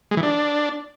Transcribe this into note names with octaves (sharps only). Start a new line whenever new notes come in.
G#3
E3
D4